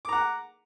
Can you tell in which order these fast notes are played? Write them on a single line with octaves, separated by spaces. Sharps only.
D6 A#5 F#5